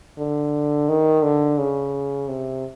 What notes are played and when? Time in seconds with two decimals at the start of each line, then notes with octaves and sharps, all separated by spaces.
0.18 D3
0.89 D#3
1.23 D3
1.58 C#3
2.28 C3